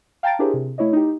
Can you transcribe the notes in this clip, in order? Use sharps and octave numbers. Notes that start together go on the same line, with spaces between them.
F5 G5 A5 A#5 A6 D7
D4 E4 G4 G#4 A#4 C5
C3
A3 E4 C#5 D#5
D#4 G4